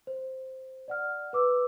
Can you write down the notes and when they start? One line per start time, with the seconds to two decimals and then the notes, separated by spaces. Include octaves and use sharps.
0.07 C5
0.88 D5 F#5 F6
1.33 B4 D6 E6